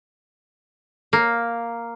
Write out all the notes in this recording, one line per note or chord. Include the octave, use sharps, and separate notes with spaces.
A#3